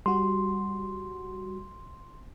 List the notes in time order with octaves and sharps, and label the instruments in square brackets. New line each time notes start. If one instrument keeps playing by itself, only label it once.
[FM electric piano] G3 F#4 [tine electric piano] C6